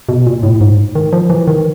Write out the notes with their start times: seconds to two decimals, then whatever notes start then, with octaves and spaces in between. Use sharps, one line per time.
0.09 B2
0.26 A#2
0.43 A2
0.61 G#2
0.95 D#3
1.13 F3
1.30 E3
1.47 D#3